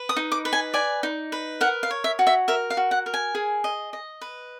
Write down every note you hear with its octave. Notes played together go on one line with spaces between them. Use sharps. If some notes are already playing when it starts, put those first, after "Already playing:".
Already playing: B4
D#6
D#4
D6
B4
G#5
D5 G#5
D#4
B4
A#4 F#5
F5
C#5
E5
F#4
E5
A#4 E5
F5
F#4
F#5
A#4
G#5
G#4
D#5
D#5
B4